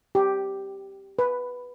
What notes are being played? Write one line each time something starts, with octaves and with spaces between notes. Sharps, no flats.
G4
B4